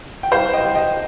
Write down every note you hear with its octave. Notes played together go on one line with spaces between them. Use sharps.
G5
C2 C5 F5
D#5 G5
C2
D#5 G5